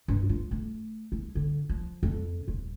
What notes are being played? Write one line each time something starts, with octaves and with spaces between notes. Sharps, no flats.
G2
F4
A3
E4
D3
F3
F2
D#1